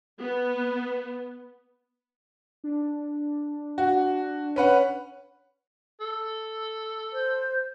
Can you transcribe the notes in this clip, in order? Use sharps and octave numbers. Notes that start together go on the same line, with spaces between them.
B3
D4
F#4
C#4 B4 F#5
A4
C5